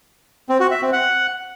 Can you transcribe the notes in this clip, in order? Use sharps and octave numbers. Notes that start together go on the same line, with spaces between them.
C4
F#4
E5
C4
F#5